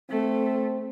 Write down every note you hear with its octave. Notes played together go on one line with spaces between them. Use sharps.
A3 C4